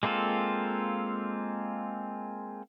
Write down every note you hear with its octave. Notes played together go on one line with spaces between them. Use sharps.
G#3 A#3 C4 F4 A4